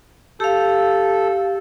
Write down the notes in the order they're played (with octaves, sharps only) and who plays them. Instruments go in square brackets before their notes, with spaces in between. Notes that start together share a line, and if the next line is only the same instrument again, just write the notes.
[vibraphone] G4 F5 [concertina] A4